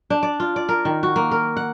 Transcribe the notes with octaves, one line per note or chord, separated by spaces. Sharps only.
D4
D5
F4
D5
A#4
D#3
F#4
A#3
A#4
F#5